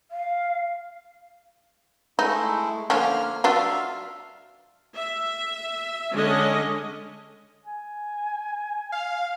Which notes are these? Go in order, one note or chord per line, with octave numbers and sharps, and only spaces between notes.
F5
G#3 A3 D#4 E4
D3 F3 A#3 C#4 F6
F#3 D4 F4 E5 F5
E5
D3 G#3 C#4 D#5
G#5
F5